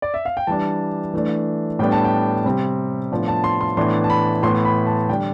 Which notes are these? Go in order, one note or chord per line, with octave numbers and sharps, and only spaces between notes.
D5
E5
F5
G5
E3 G3 D4 A5
E3 A3 D4
A2 G3 B3 D4 G5
A5
G5
C3 G3 C4
A2 F3 B3 D4
A5
C6
C6
A2 E3 B3 D4 C6
A5
B5
A2 E3 B3 C6
B5
A5
D3 G3 D4 G5